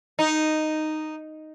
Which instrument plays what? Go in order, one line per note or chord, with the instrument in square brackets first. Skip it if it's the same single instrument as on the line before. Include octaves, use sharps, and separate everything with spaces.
[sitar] D#4